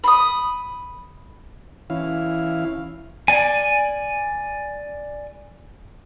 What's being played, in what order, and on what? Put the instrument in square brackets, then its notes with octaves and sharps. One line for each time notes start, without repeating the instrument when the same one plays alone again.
[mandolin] B5 C6 D#6
[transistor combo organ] E3 C#4 E4 F5
[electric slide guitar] D5 G#5